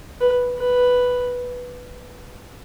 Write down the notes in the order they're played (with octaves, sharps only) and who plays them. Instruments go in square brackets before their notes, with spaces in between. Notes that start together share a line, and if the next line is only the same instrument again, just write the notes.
[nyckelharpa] B4
B4